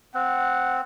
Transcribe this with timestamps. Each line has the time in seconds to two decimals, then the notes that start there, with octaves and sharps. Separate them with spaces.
0.15 C4 F#5